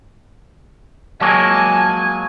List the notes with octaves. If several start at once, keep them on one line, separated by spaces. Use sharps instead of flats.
F#3 G#3 A#3 G#5 A5